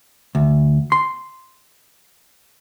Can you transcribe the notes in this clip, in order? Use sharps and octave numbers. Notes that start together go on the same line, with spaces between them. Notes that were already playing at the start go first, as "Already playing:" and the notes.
D2
C6